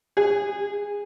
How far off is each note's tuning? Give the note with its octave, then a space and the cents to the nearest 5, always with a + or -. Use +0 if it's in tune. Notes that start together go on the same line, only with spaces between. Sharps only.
G#4 -25